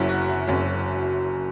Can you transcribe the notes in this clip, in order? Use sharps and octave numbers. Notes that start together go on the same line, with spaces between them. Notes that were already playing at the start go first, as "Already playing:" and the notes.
Already playing: F#1 F#2 F#3 E4
F#4
F#4
F#1 F#2 F#3